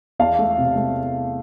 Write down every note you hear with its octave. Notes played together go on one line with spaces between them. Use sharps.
E2 F5 A5
A3
C3
A3